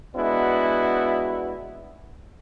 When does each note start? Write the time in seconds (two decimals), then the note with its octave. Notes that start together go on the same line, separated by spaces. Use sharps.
0.16 G#3 B3 D4 E4 F#4